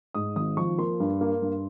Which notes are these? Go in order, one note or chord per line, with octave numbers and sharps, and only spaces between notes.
G#2 D#6
G#1 D#6
F3 C#6
A#3 C6
G2
A#3
G2